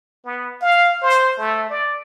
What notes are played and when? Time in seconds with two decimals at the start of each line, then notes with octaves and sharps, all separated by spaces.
0.25 B3
0.61 F5
1.02 C5
1.38 A3
1.70 D5